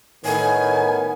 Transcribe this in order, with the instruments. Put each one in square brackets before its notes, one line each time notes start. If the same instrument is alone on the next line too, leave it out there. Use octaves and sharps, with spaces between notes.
[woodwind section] A2 [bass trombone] D#3 [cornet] B3 [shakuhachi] G#5